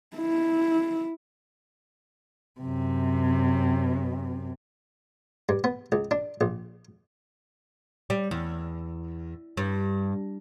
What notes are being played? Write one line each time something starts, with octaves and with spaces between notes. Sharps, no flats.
E4
F#2 C3
G2
B3
C#2
D4
A#1
G3
E2
G2